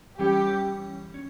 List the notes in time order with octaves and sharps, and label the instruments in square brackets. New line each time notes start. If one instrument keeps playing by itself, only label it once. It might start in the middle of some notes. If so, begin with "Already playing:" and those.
[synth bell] E3 G3 C#4 [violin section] G4
[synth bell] C#4